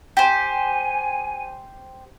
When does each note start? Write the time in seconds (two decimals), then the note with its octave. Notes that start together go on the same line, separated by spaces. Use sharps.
0.17 G4 C5 G#5